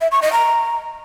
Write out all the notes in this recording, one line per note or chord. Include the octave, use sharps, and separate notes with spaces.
E5
C#6
D#5
A#5